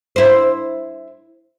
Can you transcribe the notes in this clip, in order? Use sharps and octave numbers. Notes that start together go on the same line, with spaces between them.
E4 C5